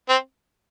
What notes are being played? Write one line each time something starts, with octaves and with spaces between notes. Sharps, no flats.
C4